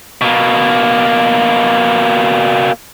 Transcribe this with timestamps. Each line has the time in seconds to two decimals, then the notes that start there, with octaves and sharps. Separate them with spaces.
0.21 B2 A#3